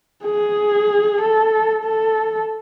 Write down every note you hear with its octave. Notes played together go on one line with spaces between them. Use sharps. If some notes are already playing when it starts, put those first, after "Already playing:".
G#4
A4
A4